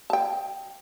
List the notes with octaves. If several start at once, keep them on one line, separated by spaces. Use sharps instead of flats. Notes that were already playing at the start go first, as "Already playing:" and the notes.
G5 A5